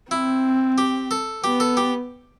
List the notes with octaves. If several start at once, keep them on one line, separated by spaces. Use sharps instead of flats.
C4 E4
G4
A4
B3 G4
A4
G4